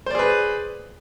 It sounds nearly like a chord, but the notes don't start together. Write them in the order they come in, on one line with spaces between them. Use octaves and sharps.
C5 D5 G#4 B4